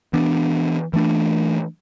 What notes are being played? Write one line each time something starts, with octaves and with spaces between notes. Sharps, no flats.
E3 B3 D4
E3 A3 D4